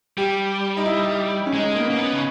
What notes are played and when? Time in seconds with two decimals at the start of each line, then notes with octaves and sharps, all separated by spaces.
0.18 G3 G4
0.77 D#4
0.86 E4
1.46 C#4
1.54 G#3 D#4
1.75 A#3 B3
1.87 A#3 C#4
1.98 B3
2.13 C#3